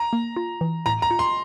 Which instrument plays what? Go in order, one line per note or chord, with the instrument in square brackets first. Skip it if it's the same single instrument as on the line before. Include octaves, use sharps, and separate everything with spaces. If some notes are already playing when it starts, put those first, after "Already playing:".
Already playing: [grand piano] A#5
[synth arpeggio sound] A#3
F4
E3
[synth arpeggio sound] A2 [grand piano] A#5
[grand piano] A#5
[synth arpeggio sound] F4
[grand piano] C6